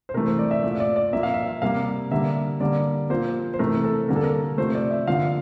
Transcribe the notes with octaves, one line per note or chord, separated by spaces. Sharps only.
C5
C3 E3 A3 A#4
C5
D5
E5
A#2 A3 D5
D5
D5
A#2 F3 A#3 E5
F5
E5
C3 G3 A#3 F5
D3 G3 A#3 E5
D3 G3 A#3 D5
A#2 F3 A#3 C5
C5
C3 E3 A3 A#4
A4
D3 G3 A#3 A#4
A4
A#4
C3 F3 A3 C5
D5
E5
D3 F3 A#3 F5